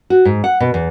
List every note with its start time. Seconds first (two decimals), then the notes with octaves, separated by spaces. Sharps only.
0.10 F#4
0.25 G#2
0.44 F#5
0.60 B2
0.74 E2